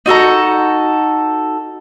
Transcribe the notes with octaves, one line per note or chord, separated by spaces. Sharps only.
D#4 F#4 A4 A#5